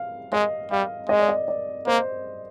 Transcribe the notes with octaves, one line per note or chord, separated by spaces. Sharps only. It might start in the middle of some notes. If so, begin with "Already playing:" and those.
Already playing: F5
G#3 D#5
G3 F5
G#3 D#5
D5
D#5
D5
A#3 C5